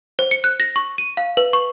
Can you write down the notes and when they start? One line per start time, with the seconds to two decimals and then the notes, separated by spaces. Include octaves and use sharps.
0.19 C5
0.31 C#7
0.44 F#6
0.60 A#6
0.76 C#6
0.98 D#7
1.17 F5
1.37 B4
1.53 C#6